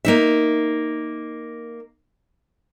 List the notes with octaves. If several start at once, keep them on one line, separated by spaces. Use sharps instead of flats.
A#3 D#4 E5